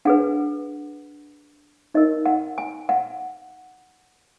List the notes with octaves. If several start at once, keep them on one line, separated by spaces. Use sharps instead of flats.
D4 G#4 B4 F#5
D#4 A#4 D#5
F#5
G#5
F#5